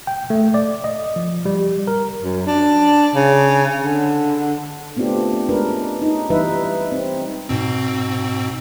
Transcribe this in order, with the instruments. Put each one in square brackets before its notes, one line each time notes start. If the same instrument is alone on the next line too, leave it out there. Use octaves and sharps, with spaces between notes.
[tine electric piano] G5
A3
D5
D#5
F3
G3
A#4
[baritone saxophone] F#2
D4
C#3
D3
[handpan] A3 B3 C4 D4 F4 G4
G#3 C#4 D4 A#4 B4
D#4
E3 G3 D#4 B4 E5
C4
[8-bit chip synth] G#2 B2 C4